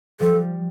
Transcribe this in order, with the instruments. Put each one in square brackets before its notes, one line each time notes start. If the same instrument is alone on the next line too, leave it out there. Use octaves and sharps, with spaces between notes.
[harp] F3 G3 [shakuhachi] A4